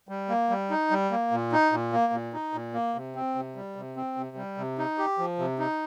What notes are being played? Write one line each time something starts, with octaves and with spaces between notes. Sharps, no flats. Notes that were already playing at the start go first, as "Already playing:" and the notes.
G3
A#3
G3
D#4
G3
A#3
A#2
D#4
A#2
A#3
A#2
D#4
A#2
A#3
C3
C4
C3
G3
C3
C4
C3
G3
C3
D#4
G4
F3
C3
D#4